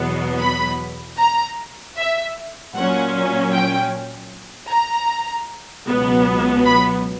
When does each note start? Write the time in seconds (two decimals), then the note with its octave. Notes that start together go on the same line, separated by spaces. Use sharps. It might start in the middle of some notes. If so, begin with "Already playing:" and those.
Already playing: E2 B2 F#3 B3
0.42 B5
1.20 A#5
1.98 E5
2.76 A#2 F#3 C#4 F#5
3.54 G5
4.71 A#5
5.88 C#2 B2 F#3 B3
6.66 B5